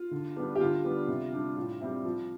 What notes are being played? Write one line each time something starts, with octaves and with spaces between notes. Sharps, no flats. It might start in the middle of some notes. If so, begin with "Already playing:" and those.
Already playing: F4
D3
G3 B3 D4
G4
D3 F4
G3 B3 D4
C3
G3 D4
A2 F4
G3 C4 E4
F3